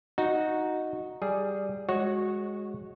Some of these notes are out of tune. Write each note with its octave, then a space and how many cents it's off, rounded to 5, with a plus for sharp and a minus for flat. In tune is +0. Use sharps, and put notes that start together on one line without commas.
D#4 +0 F#4 -10
G3 +0 G#4 +5
G#3 +0 F#4 +0 C#5 -15